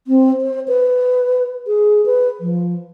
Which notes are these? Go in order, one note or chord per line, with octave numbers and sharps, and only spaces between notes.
C4
C5
B4
G#4
B4
F3